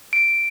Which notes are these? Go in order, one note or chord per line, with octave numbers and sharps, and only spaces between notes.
D7